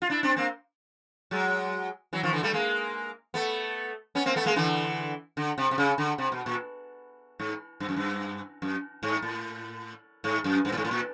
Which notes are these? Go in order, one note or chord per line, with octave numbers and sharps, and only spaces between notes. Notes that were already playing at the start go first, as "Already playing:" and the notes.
F4
D4 E4
C4 D4
A#3 C4
F#3 G#3
E3 F#3
D#3 F3
D3 E3
G3 A3
G#3 A#3
A3 B3
B3 C#4
A#3 C4
A3 B3
G#3 A#3
D3 E3
D3
C3
C3
C#3
D3
C3
B2
A#2
G#2
G2
F#2
G2
F#2
G#2
A2
G#2
F#2
G2
A2
G#2
A2
A#2